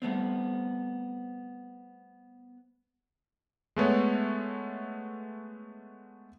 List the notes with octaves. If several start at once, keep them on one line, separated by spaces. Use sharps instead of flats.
G3 A3 B3 C4
G#3 A3 B3 C#5